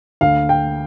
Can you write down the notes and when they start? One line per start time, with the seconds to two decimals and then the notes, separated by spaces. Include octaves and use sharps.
0.21 D2 F5
0.49 G5